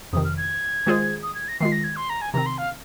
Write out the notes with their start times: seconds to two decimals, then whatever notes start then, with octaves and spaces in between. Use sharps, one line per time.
0.13 F2 C3 D#3 D#6
0.25 F6
0.37 G#6
0.86 D#3 G#3 F4 G#4 C5
1.23 D#6
1.35 G#6
1.48 A#6
1.60 D#3 G#3 F4 C7
1.72 A#6
1.84 G#6
1.96 C6
2.10 A#5
2.22 G#5
2.33 C3 D#3 C4 A#5
2.46 C6
2.58 F5